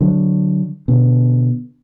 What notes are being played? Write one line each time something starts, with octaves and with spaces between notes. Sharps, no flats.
D3 F#3
B2 D3